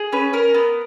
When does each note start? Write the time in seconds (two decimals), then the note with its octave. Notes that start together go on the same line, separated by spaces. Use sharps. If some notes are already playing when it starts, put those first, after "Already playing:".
Already playing: G#4
0.13 C#4 B4
0.33 C#4 A#4
0.54 B3